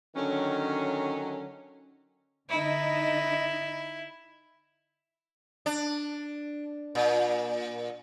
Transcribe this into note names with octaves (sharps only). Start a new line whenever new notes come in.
D3 D#3 F#3 C#4
D3 D#4 E4
D4
A#2